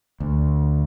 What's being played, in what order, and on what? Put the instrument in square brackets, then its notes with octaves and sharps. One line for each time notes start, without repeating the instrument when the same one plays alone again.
[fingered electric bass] D2